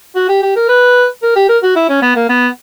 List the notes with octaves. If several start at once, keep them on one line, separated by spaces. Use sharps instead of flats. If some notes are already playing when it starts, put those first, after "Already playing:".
F#4
G4
G4
A#4
B4
A#4
G4
A#4
F#4
E4
C#4
B3
A#3
B3